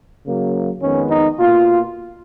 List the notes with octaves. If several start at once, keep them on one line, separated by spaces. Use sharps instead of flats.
C#3 F#3 A#3
F2 D#3 G#3 B3 C#4
D#4
B2 A#3 F4